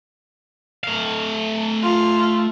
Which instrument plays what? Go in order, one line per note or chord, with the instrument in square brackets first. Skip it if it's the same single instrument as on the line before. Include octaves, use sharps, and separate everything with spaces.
[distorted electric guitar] A3 F5
[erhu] F4